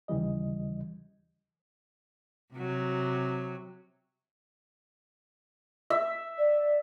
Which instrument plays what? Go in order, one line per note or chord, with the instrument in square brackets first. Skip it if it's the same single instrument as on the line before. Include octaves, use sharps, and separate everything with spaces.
[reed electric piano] D#2 C#3 E3 G3 D#5
[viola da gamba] C3 F#3
[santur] E5
[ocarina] D5